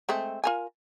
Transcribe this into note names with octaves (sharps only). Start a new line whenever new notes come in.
G#3 A3 C4
F4 A#4 G#5